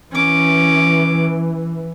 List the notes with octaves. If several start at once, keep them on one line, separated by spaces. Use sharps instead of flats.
E3 C#4 D6